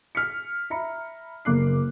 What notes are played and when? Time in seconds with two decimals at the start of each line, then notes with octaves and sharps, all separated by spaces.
0.15 F6 B6 C#7
0.70 E5 A#5 B5 C#7
1.45 F#1 A#3 D6 F#6 C7